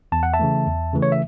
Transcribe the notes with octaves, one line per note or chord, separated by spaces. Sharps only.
E2 A5
F#5
E5 A5
C#3 E3 A3
E2
C#3 E3 A3
C#5
E5